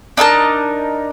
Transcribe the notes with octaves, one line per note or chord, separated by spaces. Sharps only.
D4 D#4 A#4 A5